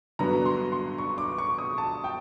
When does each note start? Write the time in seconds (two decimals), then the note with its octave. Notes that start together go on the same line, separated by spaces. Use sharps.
0.19 G2 D3 F#3 B3 A#5
0.45 C6
0.72 C6
0.98 C#6
1.18 D6
1.38 C#6
1.58 D#6
1.78 A5
2.04 G5